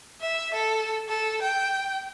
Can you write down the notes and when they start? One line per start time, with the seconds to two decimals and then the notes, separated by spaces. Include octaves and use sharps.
0.21 E5
0.54 A4
1.09 A4
1.42 G5